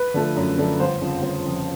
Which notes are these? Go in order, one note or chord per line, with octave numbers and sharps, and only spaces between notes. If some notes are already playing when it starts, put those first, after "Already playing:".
Already playing: B4
D3 F3 A3
F#2
D3 F3 A3
G1 C5
F2 C#3 F3
G1
F2 C#3 F3